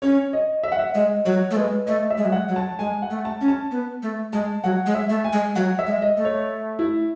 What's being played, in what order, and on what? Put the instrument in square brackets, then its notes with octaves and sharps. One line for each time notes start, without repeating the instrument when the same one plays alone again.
[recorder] C#4 [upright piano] C#5
[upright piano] D#5
E5
F#5
E5
[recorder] G#3 [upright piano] D#5
[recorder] F#3 [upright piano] C#5
[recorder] A3
[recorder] G#3 [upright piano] B4
[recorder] A3 [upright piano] D#5
[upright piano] E5
[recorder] G#3
F#3
[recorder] G#3 [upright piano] F#5
[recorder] F#3
[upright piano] A5
[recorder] G#3 [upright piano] G#5
[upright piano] F#5
[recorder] A3
[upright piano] A5
[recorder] C#4
[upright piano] A5
[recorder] B3
A3
[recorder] G#3 [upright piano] A5
[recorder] F#3 [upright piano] F#5
[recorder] G#3
[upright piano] E5
[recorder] A3
[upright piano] G#5
[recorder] G#3
[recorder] F#3 [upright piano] F#5
[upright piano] E5
[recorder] G#3
[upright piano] D#5
[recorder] A3
[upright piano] C#5
E4